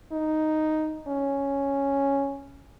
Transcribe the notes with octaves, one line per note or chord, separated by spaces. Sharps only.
D#4
C#4